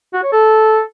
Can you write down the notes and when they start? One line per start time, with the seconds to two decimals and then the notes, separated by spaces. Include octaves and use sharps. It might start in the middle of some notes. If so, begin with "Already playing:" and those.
0.13 F#4
0.23 C#5
0.33 A4